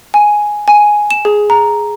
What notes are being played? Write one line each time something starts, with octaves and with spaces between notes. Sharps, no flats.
G#5
G#5
E7
G#4
A#5